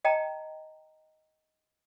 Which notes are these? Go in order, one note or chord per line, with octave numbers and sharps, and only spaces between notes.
D#5 G5 A5 A#5